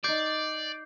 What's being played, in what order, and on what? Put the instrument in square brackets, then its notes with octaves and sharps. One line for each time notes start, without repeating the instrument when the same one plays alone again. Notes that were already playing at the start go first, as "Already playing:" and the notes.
[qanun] D#4 F#5 [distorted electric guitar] D5 [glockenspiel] D6 G6 C7